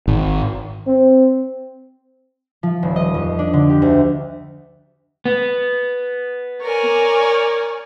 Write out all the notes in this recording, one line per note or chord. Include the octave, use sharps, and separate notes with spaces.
G#1
C4
F3
D#1
D#5
F2
D4
D3
G4
D2
B3
A#4 C#5 D5 G#5